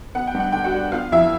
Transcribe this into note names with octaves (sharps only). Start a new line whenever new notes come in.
B3 F#5
G5
G2
F#5
D3 G5
F#4 F#5
G3
B3 F4 F5
F2 E4 E5